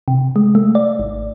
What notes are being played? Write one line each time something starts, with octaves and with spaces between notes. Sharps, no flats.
C3
G#3
A3
D5
G#1